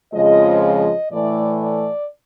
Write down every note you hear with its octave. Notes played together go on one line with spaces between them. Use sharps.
F2 C#3 F3 G#3 D#5
D#5
A2 E3 A3 D5
D5